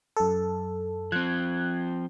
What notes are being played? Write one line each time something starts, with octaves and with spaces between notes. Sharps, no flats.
F#2 A4
F3 C4 F#6 G#6